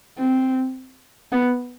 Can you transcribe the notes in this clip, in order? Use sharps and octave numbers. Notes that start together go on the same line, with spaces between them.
C4
B3